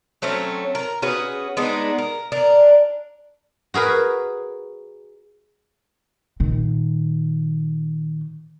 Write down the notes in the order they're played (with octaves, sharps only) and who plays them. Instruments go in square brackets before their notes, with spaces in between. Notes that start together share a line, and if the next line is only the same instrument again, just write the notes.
[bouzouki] F#3 A3 C4 C#4
A#4
C#4 F#4 G#4 B4
G#3 B3 D4 D#4
A#4
D4 A#4
[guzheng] F#4 G#4 A#4 B4
[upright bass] A#2 D#3